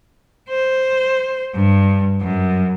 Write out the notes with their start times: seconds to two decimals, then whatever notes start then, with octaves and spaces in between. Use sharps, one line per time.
0.50 C5
1.55 G2
2.21 F#2